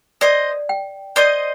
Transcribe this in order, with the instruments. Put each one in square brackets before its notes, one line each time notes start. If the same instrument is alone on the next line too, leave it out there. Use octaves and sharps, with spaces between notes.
[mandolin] C5 D#5 [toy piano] D5
[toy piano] G5
[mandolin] C5 D#5 [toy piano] D5